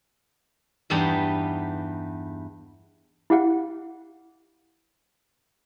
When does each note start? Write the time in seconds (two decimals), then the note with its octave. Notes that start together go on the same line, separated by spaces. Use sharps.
0.90 E2 G2 G3 B3 D#4 G4
3.30 E4 G4 F5 F#5